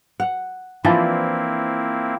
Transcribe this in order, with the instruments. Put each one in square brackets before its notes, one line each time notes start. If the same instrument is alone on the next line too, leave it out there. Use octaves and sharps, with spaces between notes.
[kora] F#5
[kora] E3 F3 D4 [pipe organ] A#3 C4 E4